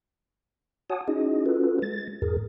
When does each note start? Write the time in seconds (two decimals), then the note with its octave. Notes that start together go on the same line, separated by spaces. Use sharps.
0.90 F#4 C#5 F#5 G#5 A5 D#6
1.08 C#4 D#4 E4 F#4 G#4 D#5
1.46 C#4 F4 F#4 A4 B4
1.82 G#3 A6
2.22 E2 G#2 G#4 A#4